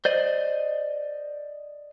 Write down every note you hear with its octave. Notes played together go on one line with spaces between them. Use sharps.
C5 D5 D#5